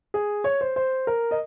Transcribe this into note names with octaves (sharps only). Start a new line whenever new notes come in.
G#4
C#5
C5
C5
A#4
D#5